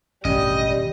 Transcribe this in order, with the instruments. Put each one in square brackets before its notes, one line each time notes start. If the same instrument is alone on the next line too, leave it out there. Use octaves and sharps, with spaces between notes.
[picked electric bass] E1 D#3 C#4 [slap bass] A1 G2 [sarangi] G3 [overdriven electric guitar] D#5